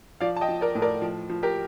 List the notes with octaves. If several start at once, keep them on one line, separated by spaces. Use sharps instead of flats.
F3 D5 F5
A5
D#5 G5
F3
A#4 D5
A2
A#4 D5
F3
F3
G4 A#4